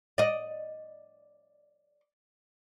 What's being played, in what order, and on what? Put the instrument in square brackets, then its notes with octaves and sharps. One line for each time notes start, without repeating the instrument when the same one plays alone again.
[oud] D5 D#5